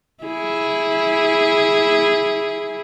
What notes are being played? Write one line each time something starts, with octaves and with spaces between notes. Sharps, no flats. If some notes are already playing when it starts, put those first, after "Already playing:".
E4 G#4